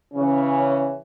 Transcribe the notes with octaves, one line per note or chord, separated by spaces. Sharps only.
C#3 E3 C#4 C#5